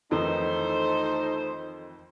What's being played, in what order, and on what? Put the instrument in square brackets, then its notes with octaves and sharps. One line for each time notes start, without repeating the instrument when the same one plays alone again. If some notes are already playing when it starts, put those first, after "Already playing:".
[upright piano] F2 D#3 E3 [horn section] A3 A4 C5 [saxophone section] D#4